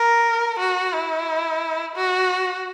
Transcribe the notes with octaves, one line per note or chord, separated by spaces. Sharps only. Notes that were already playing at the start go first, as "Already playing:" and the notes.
Already playing: A#4
F#4
E4
F#4